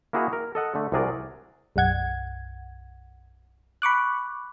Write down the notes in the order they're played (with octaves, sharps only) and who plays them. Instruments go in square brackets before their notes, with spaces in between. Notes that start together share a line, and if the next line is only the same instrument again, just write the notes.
[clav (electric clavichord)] A#3 E4 F#4 G#4 D#5 A#5
A#4
A4 D#5 F#5
D3 A3
C2 C3 F#4 G#4 A#4 D5
[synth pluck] B1 F#2 F#5 G#6
B5 C#6 D6 F#6